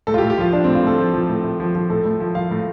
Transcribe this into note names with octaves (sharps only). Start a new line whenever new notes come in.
A2 A4
F4
G4
A2
G4
F3 F4
F3 D4
C4
A2
F4
A2 A4
F3
F3
A2
A2
F3
F3
A2 A4
A2
F3
F3 F5
A2